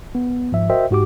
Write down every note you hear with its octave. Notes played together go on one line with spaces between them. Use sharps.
B3
G#2 F3 E5
F#4 A#4 C5 D#5 E5 G5
G#2 F#4 G4 D6